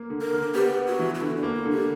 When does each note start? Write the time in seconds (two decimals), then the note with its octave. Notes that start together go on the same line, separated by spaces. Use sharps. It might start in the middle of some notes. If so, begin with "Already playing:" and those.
Already playing: A#3
0.10 D3
0.21 A#4
0.33 D3
0.54 B3 G4
0.76 B3
0.87 F#4
0.99 E3
1.15 F#4
1.21 D3 E4
1.37 D4
1.43 A#3
1.54 E4
1.66 D3
1.71 G4